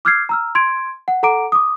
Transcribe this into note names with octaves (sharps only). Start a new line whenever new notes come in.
D6 E6 F6 G6 G#6 C7
A#5 E6 F6
C6 G#6 D7
F#5
A4 F#5 A#5 D6 D7
D6 D#6